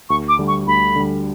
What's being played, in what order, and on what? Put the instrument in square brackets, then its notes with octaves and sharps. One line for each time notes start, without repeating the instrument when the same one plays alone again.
[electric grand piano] D2 [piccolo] C#6
[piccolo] D6
[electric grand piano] D3 G3
[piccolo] C#6
[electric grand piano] D2 [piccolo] B5
[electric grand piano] D3 G3